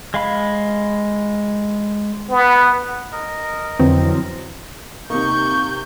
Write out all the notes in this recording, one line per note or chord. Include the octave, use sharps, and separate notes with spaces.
G#3 F5 B5
B3
A#4 D#5
F2 D3 E3 F#3 C4
C3 A#3 D#4 C#6 G6